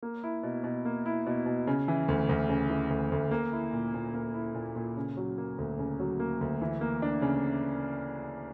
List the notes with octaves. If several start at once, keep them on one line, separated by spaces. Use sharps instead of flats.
A#3
E4
B2
B2
A#3
E4
B2
B2
C#3
E3
D2
D2
C#3
E3
D2
D2
A#3
E4
A#2
A#2
A#3
E4
A#2
A#2
C#3
F#3
A#3
D2
C#3
F#3
A#3
D2
E3
A#3
D4
C#3